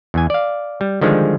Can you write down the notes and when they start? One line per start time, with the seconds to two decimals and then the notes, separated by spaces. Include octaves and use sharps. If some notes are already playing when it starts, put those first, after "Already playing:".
0.14 E2 E3 G#5
0.30 D5 F5
0.81 G3
1.01 D3 D#3 F3 G3 G#3